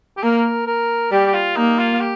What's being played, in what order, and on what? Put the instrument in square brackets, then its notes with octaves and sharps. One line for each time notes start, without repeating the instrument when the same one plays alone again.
[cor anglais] G4
[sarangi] A#3 [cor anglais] A#4
[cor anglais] A#4
[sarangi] G3 [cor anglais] G4
[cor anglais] G4
F4
[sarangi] A#3 [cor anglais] D#4
[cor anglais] F4
G4